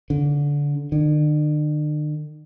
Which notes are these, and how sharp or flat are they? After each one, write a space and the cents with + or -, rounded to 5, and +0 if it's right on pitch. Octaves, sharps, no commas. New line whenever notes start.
D3 -20
D3 +45